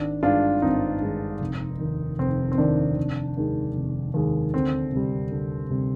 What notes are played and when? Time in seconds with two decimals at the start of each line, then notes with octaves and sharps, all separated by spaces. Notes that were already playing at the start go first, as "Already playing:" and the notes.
Already playing: G#1 D4
0.23 G2 D#3 G#3 D4 F4
0.62 G#1 C4 D#4
1.02 G2 D#3 G#3
1.41 F1
1.79 D#2 D#3
2.19 F1 C4
2.52 C4
2.58 D#2 D#3 D4
2.98 F1
3.37 D#2 D#3 G#3
3.75 F1
4.14 D#2 D#3 G#3
4.54 D2 C4
4.92 C3 G3
5.31 D2
5.70 C3 G3